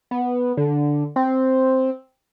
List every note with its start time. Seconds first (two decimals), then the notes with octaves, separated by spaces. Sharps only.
0.11 B3
0.57 D3
1.16 C4